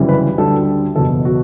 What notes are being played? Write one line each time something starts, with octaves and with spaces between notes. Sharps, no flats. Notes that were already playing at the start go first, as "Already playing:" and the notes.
Already playing: G1 F#2 C#3 E3 G3
B4
D2 D3 G3 A4
F#1 E2 B2 A4
F#4